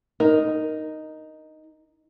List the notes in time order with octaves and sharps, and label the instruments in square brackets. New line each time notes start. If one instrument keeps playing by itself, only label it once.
[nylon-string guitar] D#4 [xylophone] A#4